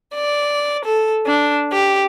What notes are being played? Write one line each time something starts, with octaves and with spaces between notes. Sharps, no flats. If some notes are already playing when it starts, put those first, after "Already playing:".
D5
A4
D4
G4